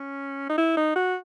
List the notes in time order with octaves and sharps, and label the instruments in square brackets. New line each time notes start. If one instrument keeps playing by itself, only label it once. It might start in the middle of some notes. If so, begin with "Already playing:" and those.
Already playing: [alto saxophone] C#4
D#4
E4
D#4
F#4